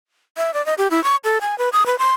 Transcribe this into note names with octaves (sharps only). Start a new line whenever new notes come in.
E5
D5
D#5
G4
E4
C#6
A4
G#5
B4
D#6
B4
C6